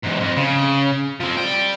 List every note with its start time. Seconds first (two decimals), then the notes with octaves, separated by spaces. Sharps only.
0.03 E2 G#2
0.20 F2
0.37 C#3
1.20 F3 C4
1.37 D5 G5